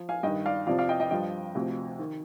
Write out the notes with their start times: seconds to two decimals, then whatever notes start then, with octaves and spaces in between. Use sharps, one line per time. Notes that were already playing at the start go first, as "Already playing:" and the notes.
Already playing: F3
0.09 F5 G#5
0.23 G2 D#3 D#5 G5
0.46 D5 F5
0.67 F2 C3 F3 D5 F5
0.78 D5 F5
0.89 D#5 G5
1.00 D#5 G5
1.11 G2 F3 D#5 G5
1.55 D2 C3 F3
1.99 D#3